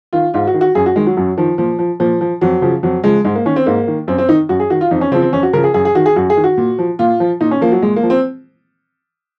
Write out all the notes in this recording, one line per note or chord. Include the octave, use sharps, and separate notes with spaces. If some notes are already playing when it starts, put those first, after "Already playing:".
D#3 F4
G#2 F4
F#4
D#3
F#4
F#2 G#4
F#4
D#3 G#3
F#3
F#2 F#3
D#3 F3
A#2 F3
F3
A#2 F3
F3
F2 F#3
C#3 F3
F2 F#3
C#3 F3 G#3
G#2 G#3
A#3
D#3 C#4
C4
G#2 A#3
D#3
F#2 C4
C4
D#3 D#4
F#2 F#4
G#4
D#3 F#4
F4
F2 D#4
C#4
C#3 F3 C4
C4
F2 C#4
F#4
C#3 F3 A#4
G#4
F#2 G#4
G#4
D#3 F#4
G#4
F#2 F#4
G#4
D#3
F#4
A#2
F3
A#2 F4
F3
A#2 D#4
C#4
F3 A#3
F#3
A#2 G#3
A#3
F3
C4